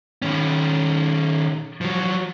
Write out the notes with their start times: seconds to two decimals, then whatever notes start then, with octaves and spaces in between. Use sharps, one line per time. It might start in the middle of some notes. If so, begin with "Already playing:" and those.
0.22 D#3 C#4
1.81 F3 F#3